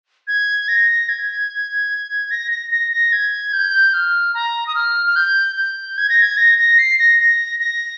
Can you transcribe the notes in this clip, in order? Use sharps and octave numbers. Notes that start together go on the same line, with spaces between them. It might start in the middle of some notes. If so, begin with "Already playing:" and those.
G#6
A#6
G#6
A#6
A#6
A#6
A#6
G#6
G6
F6
A#5
D#6
F6
F6
G6
G6
G#6
A#6
G#6
A#6
A#6
C7
A#6
A#6
A#6